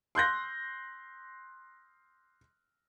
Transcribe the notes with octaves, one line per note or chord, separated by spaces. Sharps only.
C6 F#6 G6 A#6